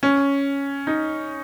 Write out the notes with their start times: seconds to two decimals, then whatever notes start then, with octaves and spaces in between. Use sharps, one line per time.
0.03 C#4
0.87 D#4